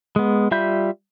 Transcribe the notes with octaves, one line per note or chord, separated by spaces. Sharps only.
G#3 B3
G3 F4 E5 B5 G6